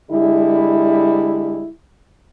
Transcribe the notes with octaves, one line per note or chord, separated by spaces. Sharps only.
D3 G3 G#3 E4